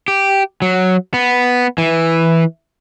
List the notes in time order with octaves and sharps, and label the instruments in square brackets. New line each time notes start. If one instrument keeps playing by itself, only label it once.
[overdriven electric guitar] G4
F#3
B3
E3